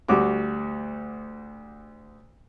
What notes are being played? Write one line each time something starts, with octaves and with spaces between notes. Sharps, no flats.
D2 G3 F#4 D6